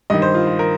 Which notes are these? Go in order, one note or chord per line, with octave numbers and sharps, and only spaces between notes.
G2 D#3 D#5
C5
F4
F4
A#4